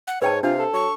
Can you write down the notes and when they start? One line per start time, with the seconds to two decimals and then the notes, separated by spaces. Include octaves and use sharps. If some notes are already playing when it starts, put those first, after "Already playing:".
0.07 F#5
0.22 G#2 B4 C#5 G5 A5
0.43 C3 D4 F4 F5
0.58 A4
0.74 F#3 C#6